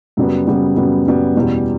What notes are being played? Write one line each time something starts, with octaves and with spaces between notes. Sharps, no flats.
F#2 C#3 G3 B3
F#2 C#3 G3 B3
F#2 C#3 G3 B3
F#2 C#3 G3 B3
E2 B2 G3 C#4